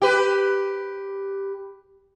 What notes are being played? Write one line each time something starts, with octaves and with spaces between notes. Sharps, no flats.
G4 B4